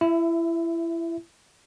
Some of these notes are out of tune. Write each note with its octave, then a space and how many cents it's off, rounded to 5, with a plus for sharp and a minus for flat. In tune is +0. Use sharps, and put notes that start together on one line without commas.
E4 +25 E5 +0